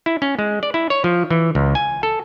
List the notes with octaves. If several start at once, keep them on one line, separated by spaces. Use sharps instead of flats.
E4
C#4
G#3
D5
E4
C#5
F3
E3
C#2
G#5
A4